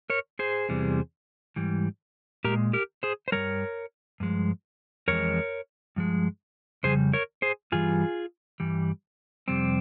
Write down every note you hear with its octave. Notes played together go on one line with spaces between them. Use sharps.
A#4 C#5
G#4 C5
E2 C3 E3 G3
G#2 E3 G3
A#2 G#3 G4 A#4
G4 A#4
G#4 C5
C5
G2 E3 G3 A#4 C#5
G2 F3 G#3
F2 E3 G#3 A#4 C#5
G2 F3 G#3
F2 C#3 G3 G#4 C5
A#4 C#5
G#4 C5
G2 E3 G3 F4 G#4
G2 E3 G3
F2 C3 G3 C4